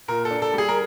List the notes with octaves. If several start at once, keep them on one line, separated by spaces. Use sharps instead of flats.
A#2 A#4
A4
D4
A4
G3 G#4
A#4